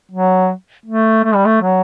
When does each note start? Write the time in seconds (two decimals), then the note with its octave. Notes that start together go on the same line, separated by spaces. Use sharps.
0.11 F#3
0.86 A3
1.24 A3
1.35 G3
1.46 A3
1.62 F#3